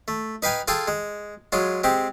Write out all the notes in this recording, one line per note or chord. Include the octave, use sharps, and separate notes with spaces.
A3
D#4 B4 F5 G5 G#5
F4 G#4 A4 G5 G#5
G#3
F#3 G#3 F4
G#3 C4 G4